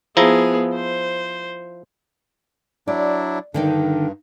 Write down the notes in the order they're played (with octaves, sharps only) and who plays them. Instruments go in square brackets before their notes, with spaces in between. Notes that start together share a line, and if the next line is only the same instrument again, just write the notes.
[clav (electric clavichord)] F3 E4 A#5 [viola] B3 G#4
[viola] C5
[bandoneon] F#3 D4 E4 [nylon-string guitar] D5
[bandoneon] G2 [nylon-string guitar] D3 D#3 D#4